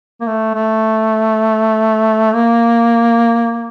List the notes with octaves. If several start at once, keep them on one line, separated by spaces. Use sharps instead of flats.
A#3
A3
A3
A#3